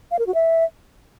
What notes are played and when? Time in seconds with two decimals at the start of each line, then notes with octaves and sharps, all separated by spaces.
0.11 F5
0.19 A#4
0.27 F#4
0.34 E5